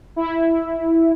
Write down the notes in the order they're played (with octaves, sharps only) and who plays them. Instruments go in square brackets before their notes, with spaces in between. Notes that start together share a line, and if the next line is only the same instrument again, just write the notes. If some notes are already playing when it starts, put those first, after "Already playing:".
[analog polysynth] E4